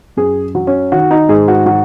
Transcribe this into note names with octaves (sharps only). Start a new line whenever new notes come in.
F#2 G#4
F#3
C#4
D#3 F#4
D#4
G#2 G#4
F#4
F#3 F#4